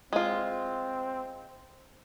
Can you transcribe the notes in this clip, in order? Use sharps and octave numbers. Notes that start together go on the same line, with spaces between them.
G#3 C4 F4